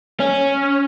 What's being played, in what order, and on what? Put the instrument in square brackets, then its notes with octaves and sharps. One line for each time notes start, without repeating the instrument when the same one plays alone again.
[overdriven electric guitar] C#4